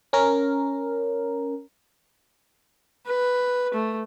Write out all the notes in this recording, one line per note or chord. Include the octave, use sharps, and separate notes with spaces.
C#4 A#4
B4
A3